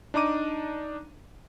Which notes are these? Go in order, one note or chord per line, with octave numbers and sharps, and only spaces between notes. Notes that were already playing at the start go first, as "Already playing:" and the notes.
D4 D#4 A#5 D6 D#7